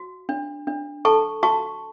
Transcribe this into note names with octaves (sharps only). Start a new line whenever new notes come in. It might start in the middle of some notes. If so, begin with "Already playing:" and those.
Already playing: F#4
D4
D4
A4 A5 C#6
F#4 A5 C#6